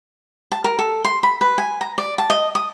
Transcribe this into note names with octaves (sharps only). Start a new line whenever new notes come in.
A5
A#4
A4
C6
B5
B4
G#5
A#5
D5
A5
D#5
D#6